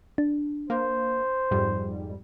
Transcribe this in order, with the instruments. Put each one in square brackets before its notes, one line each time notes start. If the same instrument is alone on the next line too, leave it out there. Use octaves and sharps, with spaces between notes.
[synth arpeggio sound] D4
[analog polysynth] A#3 [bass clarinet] C5
[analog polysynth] F2 G#2 G3